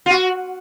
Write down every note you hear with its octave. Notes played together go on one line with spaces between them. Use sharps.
F4
F#4